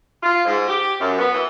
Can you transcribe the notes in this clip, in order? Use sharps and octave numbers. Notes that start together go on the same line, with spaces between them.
F4
G#2
G4
F#2
B3
E3